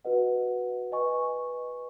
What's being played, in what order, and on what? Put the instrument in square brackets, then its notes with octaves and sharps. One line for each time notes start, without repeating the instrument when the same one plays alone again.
[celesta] F#4 B4 D#5 F#5
B4 D#5 G#5 C#6